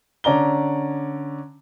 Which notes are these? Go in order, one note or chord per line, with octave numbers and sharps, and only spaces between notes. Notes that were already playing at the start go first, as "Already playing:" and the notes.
D3 C#4 D5 A#5 G7